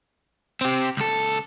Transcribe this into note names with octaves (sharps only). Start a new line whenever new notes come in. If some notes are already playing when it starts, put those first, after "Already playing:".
C4 G4
C#2 A4